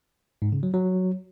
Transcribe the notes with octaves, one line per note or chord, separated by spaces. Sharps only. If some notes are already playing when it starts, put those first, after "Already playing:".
G#2
C#3
F#3
F#3